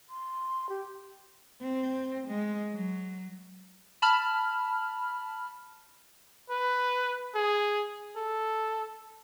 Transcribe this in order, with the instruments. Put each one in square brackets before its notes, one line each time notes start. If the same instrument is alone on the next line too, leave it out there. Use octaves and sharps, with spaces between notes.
[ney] C6
G4
[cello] C4
G#3
F#3
[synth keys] A5 B5 F6
[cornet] B4
G#4
A4